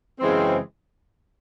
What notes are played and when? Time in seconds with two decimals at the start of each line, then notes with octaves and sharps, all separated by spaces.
0.20 F#2 C#3 E3 G#3 C4